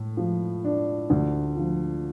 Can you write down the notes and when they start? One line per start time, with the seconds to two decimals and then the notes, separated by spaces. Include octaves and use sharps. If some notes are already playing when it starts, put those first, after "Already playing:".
Already playing: A2 A3
0.17 F3
0.65 D4
1.10 D2
1.57 F3